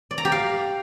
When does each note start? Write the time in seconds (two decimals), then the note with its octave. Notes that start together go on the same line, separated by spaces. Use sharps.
0.11 D5
0.18 A#5
0.25 G4
0.32 F5